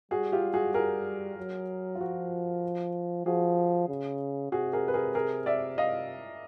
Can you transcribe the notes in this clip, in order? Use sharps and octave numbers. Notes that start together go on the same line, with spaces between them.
G3 F#4 G#4
F4 G4
F#4 G#4
G#4 A#4
F#3
F4
F3 F#4
F3 F#4 G#4
C#3
C3 F#4 G#4
G#4 A#4
B4
G#4 A#4
G#4 A#4
D5 E5
D#5 F5